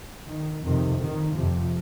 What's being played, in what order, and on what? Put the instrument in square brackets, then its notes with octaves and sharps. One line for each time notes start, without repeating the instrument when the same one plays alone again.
[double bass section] D#3
F2 C3 D#3
D#3
F2 C3 F3